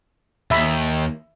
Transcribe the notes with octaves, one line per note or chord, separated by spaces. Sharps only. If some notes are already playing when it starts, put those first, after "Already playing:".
D#2 E5 B5